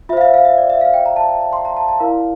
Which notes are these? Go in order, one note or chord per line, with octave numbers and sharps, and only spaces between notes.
F4 C5 E5 F5
E5
F5
E5
D5
E5
F5
G5
A#5
A5
G5
A#5
C6
A#5
A5
A5
E4 A#4 D5 F5